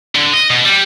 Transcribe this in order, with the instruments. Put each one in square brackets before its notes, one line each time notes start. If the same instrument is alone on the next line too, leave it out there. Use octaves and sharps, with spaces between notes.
[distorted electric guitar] D3
D#5
B2
G3